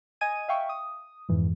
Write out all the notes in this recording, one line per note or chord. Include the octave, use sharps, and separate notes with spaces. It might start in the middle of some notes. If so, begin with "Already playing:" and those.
D#5 G#5 D#6 G#6 D#7
E5 F5 G5 C#6
D#6
F2 G#2 E3